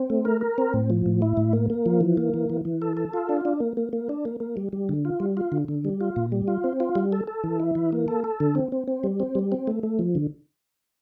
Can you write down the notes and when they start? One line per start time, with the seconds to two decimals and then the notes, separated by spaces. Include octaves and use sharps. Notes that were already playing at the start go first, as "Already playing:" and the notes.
Already playing: C4
0.10 A3
0.25 A#4
0.41 A#4
0.58 C4
0.74 A2
0.90 F3
1.06 A2
1.22 E4
1.37 A2
1.53 A#3
1.70 A#3
1.86 F3
2.01 E3
2.17 A#3
2.34 E3
2.50 E3
2.65 E3
2.82 A4
2.97 A4
3.14 F4
3.29 D4
3.45 D4
3.60 A#3
3.77 A#3
3.93 A#3
4.09 D4
4.25 A#3
4.40 A#3
4.57 G3
4.73 G3
4.89 D3
5.05 F4
5.20 G3
5.37 F4
5.52 D3
5.68 D3
5.85 G3
6.01 F4
6.16 A#2
6.32 G3
6.48 F4
6.64 C4
6.80 F4
6.95 G3
7.12 A4
7.27 A4
7.44 E3
7.60 E4
7.75 E3
7.92 A#3
8.08 A4
8.24 A4
8.40 D3
8.55 C4
8.72 C4
8.88 C4
9.04 G3
9.20 C4
9.35 G3
9.52 C4
9.67 A3
9.83 A3
9.99 F3
10.15 D3